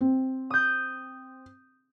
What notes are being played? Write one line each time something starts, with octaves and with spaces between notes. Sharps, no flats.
C4
D#6 G6